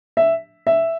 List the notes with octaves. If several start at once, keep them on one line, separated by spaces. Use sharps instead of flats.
E5
E5